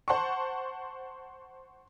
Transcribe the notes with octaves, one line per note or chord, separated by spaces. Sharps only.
C5 F#5 A5 C6 C#6